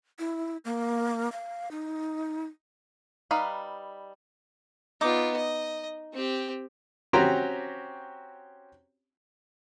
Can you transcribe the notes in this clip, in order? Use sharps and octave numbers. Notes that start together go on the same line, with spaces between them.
E4
A#3
F5
D#4
G3 D#4 B4 F5
B3 D#4 F4 D6 D#6
D#5
C4 G4
C4 C#4 F#4 G4 G5 A#5